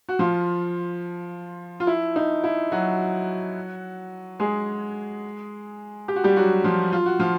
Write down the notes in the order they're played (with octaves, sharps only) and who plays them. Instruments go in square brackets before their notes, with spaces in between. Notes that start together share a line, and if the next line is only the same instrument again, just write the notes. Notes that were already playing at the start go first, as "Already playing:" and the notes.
[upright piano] F#4
F3 F4
F4
E4
D#4
E4
F#3 F#4
G#3 G#4
G4
F#4
G3 G4
F#3 F#4
F3 F4
F4
F#4
F3 F4